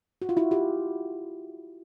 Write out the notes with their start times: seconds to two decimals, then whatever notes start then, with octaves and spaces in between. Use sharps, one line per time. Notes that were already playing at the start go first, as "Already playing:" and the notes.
0.22 F#4
0.29 F4
0.37 E4 F#4
0.51 F4 G4